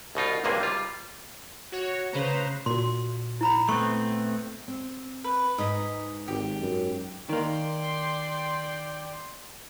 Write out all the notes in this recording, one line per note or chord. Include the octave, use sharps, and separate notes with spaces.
C2 B2 D#4 F4
G#1 C#2 G2 C3 A#3 G#4
G3 F4
F#4 C#5
C#3 B4 C5 A#5
A#2 F#4 C6
E4 A#5 B5
A3 B3 C4 C#6
C4
B4
G#2 D#4 B4 D#5
G#1 G4
F#2
D#3 A#3 D5 G5 C6